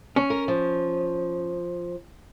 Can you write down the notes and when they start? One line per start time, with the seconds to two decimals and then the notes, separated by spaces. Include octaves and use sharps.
0.16 C#4
0.30 A#4
0.48 F3